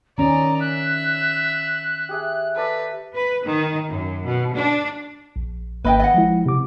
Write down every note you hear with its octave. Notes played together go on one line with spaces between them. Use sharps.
D#3 C#4 D5 D#5 A#5
E5 F#6
G4 G#4 E5
A4 B4 D5
B4
D#3
F#2
B2
D4
A#1
G#1 A#3 B4 D#5 G5 B5
D#5 F#5
F3 G#3 E4
C3 D6